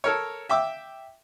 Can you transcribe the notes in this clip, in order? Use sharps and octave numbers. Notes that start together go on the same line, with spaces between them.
A4 A#4 C#5
E5 G5 D6 E6